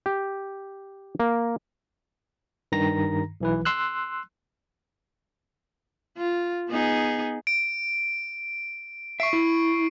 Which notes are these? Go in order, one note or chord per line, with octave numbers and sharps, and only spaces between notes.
G4
A#3
G2 D#3 A#5 A#6
B1 E3 B4
C6 E6 F#6
F4
B3 D#4 G#4
D7
E5 C#6 C7 D7
E4